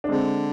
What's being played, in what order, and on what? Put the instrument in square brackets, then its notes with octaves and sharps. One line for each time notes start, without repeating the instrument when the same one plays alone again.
[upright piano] D4
[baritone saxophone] D3 [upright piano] G#3 C4